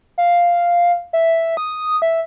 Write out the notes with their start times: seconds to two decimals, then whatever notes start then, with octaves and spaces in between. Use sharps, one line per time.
0.18 F5
1.13 E5
1.57 D#6
2.02 E5